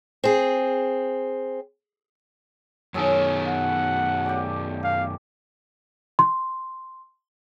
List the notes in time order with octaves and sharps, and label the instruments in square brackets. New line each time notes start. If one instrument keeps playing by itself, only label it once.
[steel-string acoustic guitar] C4 G#4
[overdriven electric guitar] F#2 D#3 [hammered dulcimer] G#4 A4 C#5
[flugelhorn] F#5
[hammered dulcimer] G4 D5
[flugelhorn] F5
[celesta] C6